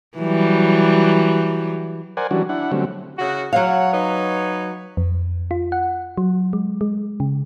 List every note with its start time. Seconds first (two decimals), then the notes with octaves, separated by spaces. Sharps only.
0.18 E3 F#3 G3
2.17 A#4 C5 D5 F#5 G#5
2.31 E3 F#3 G3 C#4 D4 F#4
2.49 D4 E4 F#5
2.72 D3 F#3 G3 A3 C4 C#4
3.18 C#3 E4 F#4
3.53 F#3 C#5 F5 F#5
3.91 D#4 B4 C#5
4.97 F2
5.51 F4
5.72 F#5
6.18 F#3
6.53 G#3
6.81 G#3
7.20 C#3